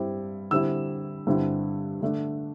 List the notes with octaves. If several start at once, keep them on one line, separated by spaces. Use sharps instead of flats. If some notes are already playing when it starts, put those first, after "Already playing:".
Already playing: G2 G3 C4 E4
D3 G3 C4 E4 E6
G2 D3 C4 E4
D3 A3 D4